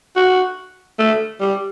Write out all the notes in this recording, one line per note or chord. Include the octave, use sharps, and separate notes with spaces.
F#4
A3
G3